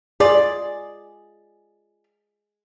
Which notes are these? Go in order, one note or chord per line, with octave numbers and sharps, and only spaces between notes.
F4 G#4 D5